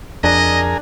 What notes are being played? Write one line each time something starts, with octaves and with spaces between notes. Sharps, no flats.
F2 D4 G#4 A#4 D5 D#5